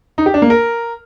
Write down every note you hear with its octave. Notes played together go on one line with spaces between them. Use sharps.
D#4
G4
D4
A#3
A#4